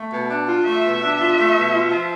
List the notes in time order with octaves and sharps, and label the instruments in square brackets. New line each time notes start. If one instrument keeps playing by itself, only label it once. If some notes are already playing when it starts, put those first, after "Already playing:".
Already playing: [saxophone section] A3
B2
D4
F4
[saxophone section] A3 [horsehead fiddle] E5
[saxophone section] B2
D4
F4
A3
B2
F4
F3